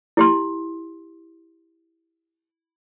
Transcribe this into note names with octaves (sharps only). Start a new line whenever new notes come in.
E4 G4 C6